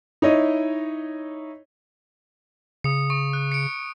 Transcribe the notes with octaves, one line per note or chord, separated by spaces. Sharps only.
D#4 E4 C#5 D#5
C#3 D#6 C#7
C#6
F#6
C#7 D7